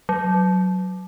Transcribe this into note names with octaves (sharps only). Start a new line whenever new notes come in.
F#3